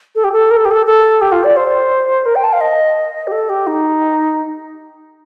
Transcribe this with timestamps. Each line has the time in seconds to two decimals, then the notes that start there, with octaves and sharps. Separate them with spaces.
0.15 A4
0.24 G4
0.32 A4
0.51 A#4
0.57 A4
0.65 G4
0.71 A4
0.86 A4
1.21 G4
1.32 F4
1.44 D5
1.56 C5
2.26 A#4
2.35 G5
2.44 A5
2.53 F5
2.61 D#5
3.27 G4
3.32 A4
3.49 G4
3.67 D#4